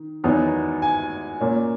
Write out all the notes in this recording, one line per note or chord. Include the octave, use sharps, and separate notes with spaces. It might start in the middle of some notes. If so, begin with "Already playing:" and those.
Already playing: D#3
E2 D#3 F#3 B3 D#4
G#5
A#2 A#3 C#4